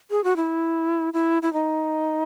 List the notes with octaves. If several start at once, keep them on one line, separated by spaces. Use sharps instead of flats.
G#4
F#4
E4
E4
E4
D#4